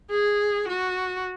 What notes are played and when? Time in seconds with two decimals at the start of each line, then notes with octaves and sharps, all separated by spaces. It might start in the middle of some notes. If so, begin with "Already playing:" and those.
0.10 G#4
0.68 F#4